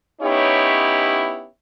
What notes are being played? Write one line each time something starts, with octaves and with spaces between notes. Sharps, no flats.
B3 C#4 D#4 E4 G4 C#5